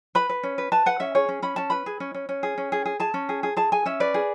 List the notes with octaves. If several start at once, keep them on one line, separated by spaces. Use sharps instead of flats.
B4 B5
B4
C#4
B4
B4 A5
B4 F#5
C#4 E5
G#4 C#5
C#4
C#4 B5
C#4 A5
B4 B5
G#4
C#4
C#4
C#4
G#4
C#4
G#4
G#4
G#4 A5
C#4
G#4
G#4
G#4 A5
G#4 G#5
C#4 E5
B4 D5
G#4